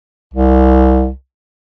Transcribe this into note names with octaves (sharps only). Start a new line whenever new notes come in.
C2